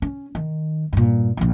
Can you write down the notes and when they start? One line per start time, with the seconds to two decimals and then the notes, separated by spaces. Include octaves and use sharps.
0.02 C#4
0.35 D#3
0.93 G2 A#2
1.37 A#1 F3